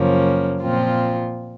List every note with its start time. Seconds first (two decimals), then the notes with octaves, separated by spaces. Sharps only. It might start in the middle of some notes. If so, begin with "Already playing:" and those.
Already playing: F#2 C#3 F3 A#3 C#4
0.61 A#2 F3 C4 F4